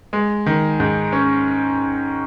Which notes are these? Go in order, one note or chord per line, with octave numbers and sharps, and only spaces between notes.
G#3
D#3
G#2
C#4